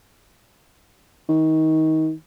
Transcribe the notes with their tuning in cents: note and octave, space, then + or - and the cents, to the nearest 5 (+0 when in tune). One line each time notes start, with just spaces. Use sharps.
D#3 +25